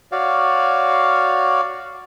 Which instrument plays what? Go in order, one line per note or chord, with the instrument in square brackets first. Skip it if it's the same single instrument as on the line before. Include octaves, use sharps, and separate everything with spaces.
[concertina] F#4 C#5 D5 F5